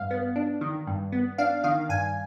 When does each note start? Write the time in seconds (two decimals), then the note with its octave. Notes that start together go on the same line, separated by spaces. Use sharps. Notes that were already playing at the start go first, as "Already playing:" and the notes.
Already playing: G2 F5
0.11 B3
0.36 D4
0.61 D#3
0.87 G2
1.12 B3
1.38 D4 F5
1.63 D#3 F5
1.89 G2 G#5